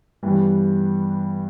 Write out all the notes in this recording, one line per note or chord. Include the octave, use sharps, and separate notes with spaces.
G2 E3 G3 B3